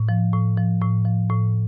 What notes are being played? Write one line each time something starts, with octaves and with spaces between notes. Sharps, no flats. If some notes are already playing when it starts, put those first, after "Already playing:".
Already playing: A2
F3
A2
F3
A2
F3
A2